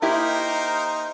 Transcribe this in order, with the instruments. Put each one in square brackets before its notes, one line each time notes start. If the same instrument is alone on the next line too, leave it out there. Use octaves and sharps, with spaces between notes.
[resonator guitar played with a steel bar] A#3 E4 G4 [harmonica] D#4 A#4 C5